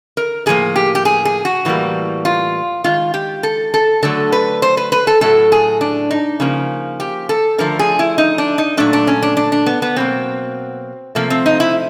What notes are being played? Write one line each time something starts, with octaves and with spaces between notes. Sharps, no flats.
A#4
A2 F3 A#3 G#4
G4
G4
G#4
G#4
F#4
A2 E3 G3 A#3
F4
D#3 G#3 F4
G4
A4
A4
D3 F#3 A3 A4
B4
C5
B4
B4
A4
A2 F#3 A3 A4
G#4
D4
D#4
C#3 F3 A#3
G4
A4
D3 F3 A3 A#4
G#4
E4
D#4
D4
D#4
A#2 F#3 A3 D4
D4
C#4
D4
D4
D4
B3
B3
B2 F#3 A#3 C4
C3 F3 A3 A#3
C4
D#4
E4